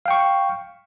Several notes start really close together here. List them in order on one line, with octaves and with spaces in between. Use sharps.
F5 G5 C#6